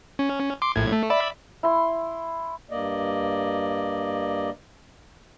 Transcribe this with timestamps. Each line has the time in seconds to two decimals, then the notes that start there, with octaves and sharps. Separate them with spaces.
0.19 C#4
0.62 C6 D6
0.76 A#1 A2 G#6
0.92 A3
1.10 D5 E5 B5
1.63 E4 C6
2.71 G2 A#3 D5 D#5